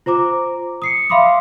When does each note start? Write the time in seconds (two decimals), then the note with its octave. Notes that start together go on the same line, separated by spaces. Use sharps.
0.06 F4 C5 A#5 D6
0.82 D#6 C7 C#7
1.10 E5 F5 B5 C6 D6 D#6